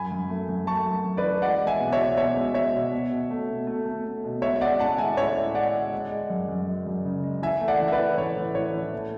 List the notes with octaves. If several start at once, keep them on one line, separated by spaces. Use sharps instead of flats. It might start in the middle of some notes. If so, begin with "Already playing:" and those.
Already playing: F#2 G#5 B5
F#2
A3
F#2
A3 A5 C#6
F#2
F#2
B4 D5
E3
G#3 D5 F#5
G#3
E5 G#5
B2
C#5 E5
B2
B2 C#5 E5
G#3
G#3 C#5 E5
B2
B2
B2
A3
B2
A3
A3
A3
B2
G#3 C#5 E5
G#3 D5 F#5
A2 F#5 A5
G#3 E5 G#5
A2 C#5 E5
G#3
G#3 D5 F#5
G#3
G#3
G#3
F#2
F#2
G#3
F#2
C#3
G#3
E3 E5 G#5
A3
D5 F#5
E3
E5
B4 D5
E3
A2 C#5
A2
A2 C#5
E3
A3